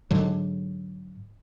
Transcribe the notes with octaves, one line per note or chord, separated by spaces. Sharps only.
G#2 D3 F#3